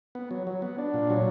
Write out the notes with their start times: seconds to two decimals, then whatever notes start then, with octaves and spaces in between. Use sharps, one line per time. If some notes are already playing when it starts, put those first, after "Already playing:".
0.15 B3
0.31 F#3
0.47 F#3
0.62 B3
0.78 D4
0.94 A#2
1.10 F#3